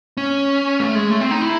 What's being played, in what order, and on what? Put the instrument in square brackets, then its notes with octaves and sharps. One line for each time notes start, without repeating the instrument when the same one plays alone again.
[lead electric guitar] C#4
A3
G#3
A3
C4
D#4
E4